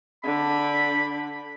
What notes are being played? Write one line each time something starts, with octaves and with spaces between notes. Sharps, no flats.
D3 B5